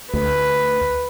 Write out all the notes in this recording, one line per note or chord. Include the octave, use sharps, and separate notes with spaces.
D2 B4